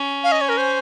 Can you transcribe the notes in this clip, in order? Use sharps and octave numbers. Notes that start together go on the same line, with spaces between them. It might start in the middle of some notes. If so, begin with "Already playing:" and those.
Already playing: C#4
F5
D#5
C#5
A#4
C5